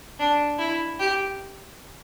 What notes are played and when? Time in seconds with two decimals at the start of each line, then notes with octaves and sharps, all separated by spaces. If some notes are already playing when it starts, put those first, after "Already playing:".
0.19 D4
0.59 E4
0.99 G4